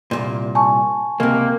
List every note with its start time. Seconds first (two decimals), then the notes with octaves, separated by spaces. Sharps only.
0.11 C2 F2 A#2
0.55 G#5 A5 C#6
1.20 C#2 C3 A#3